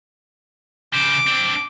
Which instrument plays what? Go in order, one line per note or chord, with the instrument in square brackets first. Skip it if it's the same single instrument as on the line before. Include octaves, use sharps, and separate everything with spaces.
[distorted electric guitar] C#3 C5 [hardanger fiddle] D6
[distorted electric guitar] C4 D4